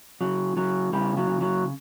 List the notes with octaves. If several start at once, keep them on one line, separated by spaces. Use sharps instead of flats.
C#3 F#3
C#3 F#3
C#3 G3
F#3
C#3
F#3